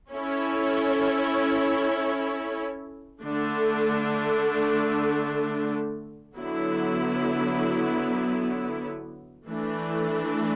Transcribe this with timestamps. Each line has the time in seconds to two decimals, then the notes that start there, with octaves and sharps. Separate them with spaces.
0.12 C#4 E4 A4 C#5
3.23 D3 A3 D4 A4
6.35 D3 F#3 B3 E4
9.47 E3 A3 D4